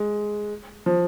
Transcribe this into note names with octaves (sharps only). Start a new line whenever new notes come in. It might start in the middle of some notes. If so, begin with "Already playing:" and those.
Already playing: G#3
F3